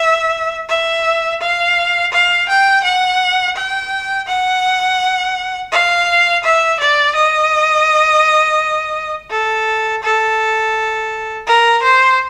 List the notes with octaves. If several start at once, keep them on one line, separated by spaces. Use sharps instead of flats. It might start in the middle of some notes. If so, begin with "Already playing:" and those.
Already playing: E5
E5
F5
F5
G5
F#5
G5
F#5
F5
E5
D5
D#5
A4
A4
A#4
C5